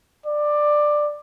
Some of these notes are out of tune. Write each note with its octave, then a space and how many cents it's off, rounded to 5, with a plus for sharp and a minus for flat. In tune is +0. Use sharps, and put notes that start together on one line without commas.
D5 +15